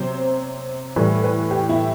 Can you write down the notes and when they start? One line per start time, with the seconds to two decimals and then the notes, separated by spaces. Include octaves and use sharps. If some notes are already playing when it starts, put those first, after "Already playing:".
Already playing: C3 F#3 C5
0.96 A2 E3 G3 B4
1.24 B4
1.51 G4
1.69 E4